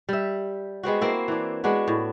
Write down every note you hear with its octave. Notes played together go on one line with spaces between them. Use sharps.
G3 E5
G#3 B3 C4 F#4
A#3 C4 E4
E3 D4
G#3 B3 D4 F#4
A2